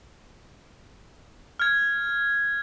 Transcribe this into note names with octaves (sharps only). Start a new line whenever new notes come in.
F6 G#6